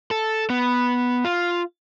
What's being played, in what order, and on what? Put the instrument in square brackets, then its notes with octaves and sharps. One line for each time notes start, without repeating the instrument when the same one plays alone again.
[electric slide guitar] A4
B3
F4